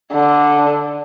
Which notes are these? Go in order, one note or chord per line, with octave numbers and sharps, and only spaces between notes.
D3